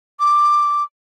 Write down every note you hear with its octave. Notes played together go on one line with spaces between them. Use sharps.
D6